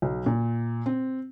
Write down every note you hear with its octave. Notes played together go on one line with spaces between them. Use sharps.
B1
A#2
C4